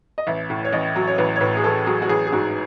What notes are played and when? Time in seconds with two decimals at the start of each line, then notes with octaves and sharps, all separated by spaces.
0.18 D#5
0.27 A1 E5
0.50 A2
0.65 C#5
0.73 A1 D#5
0.96 F#3
1.08 C#5
1.18 A1 B4
1.36 C#5
1.41 A2 B4
1.57 G#4
1.64 A1 A4
1.86 F#3 G#4
2.02 F#4
2.09 A1 G#4
2.27 G#4
2.32 G#2 F#4